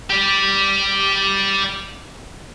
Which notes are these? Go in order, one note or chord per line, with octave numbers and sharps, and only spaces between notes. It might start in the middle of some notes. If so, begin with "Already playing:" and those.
G4 D5